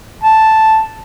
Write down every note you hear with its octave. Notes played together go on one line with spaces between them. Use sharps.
A5